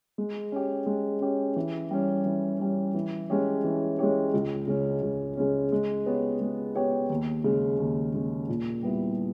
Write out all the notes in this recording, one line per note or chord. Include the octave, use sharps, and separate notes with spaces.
G#3
C#4 G4
G#3
C#4 G4
E3
G3 C#4
E3
G3 C#4
E3
G#3 C#4 G4 C#5
E3
G#3 C#4 G4 C#5
C#2
C#3 G#3 C#4
C#2
C#3 G#3 C#4
G#3
B3 G4 C#5
G#3
B3 G4 C#5
D#2
C#3 G#3
D#2
C#3 G#3
A#2
G3 B3 E4